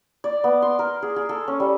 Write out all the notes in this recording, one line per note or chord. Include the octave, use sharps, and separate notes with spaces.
D5
B3
C6
A#4
G#4
G#4
A4
C#4
G3